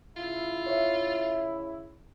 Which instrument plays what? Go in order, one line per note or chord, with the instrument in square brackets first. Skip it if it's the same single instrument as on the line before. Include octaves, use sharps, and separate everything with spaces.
[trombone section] C#3 E4 [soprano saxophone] F4
[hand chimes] C#5 E5